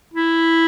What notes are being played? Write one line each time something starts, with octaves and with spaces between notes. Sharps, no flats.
E4